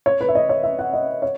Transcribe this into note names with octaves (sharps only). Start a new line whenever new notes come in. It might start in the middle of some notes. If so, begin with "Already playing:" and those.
C#5
B4
E5
D#5
C#5
E5
F#5
D#5
C#5